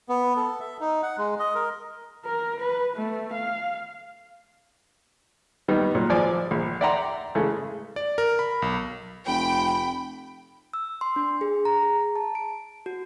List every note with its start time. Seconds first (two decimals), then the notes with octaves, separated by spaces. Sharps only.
0.09 B3
0.36 A4
0.60 E5
0.80 D#4
1.03 F#5
1.18 G#3
1.39 D#5
1.55 A#4
2.25 A#4
2.61 B4
2.96 A3
3.34 F5
5.68 D#3 G3 B3 D#4
5.95 A#2 F#3
6.09 G#1 F3 D5 G#5
6.51 A#1
6.81 D5 E5 F#5 G5 A#5 C6
7.35 C#3 E3 G#3 A3
7.96 D5
8.18 A#4
8.39 B5
8.62 B1
9.27 F1 G5 B5
10.74 E6
11.01 C6
11.16 D4
11.41 G#4
11.65 A#5
11.83 G#4
12.16 A5
12.35 D7
12.86 F#4